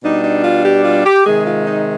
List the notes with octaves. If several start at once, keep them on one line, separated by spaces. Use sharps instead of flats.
B2 G3 D4 D#4
D#4
F4
G4
F4
G4
C3 D#3 G#3 G#4
F4
D#4